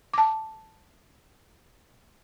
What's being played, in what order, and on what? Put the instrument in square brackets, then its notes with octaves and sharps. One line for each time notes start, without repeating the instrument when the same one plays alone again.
[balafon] A5 D6